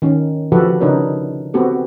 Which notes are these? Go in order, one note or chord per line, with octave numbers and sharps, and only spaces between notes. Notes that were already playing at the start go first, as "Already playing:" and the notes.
D#3 C#4
D3 F3 F#4 G4 A4 B4
C#3 D4 D#4 A#4 B4 C#5
B3 C4 F#4 G4 A4